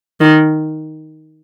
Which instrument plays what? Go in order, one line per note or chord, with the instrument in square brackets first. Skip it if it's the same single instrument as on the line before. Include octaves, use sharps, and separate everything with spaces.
[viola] D#3